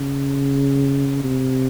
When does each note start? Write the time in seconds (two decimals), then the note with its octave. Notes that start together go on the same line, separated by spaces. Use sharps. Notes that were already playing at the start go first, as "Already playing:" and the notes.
Already playing: C#3
1.24 C3